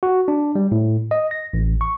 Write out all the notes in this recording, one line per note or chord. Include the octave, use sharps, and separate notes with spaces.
F#4
D4
G3
A2
D#5
A#6
A1
C#6